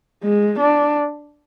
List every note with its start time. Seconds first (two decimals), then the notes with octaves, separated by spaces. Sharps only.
0.23 G#3
0.59 D4